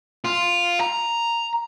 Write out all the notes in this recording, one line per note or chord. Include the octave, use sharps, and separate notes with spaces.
F4
A#5